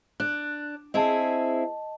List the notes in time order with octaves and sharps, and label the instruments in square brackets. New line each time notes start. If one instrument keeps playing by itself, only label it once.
[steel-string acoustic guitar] D4 [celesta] F#6
[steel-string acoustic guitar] C4 E4 G#4 [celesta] D#5 A5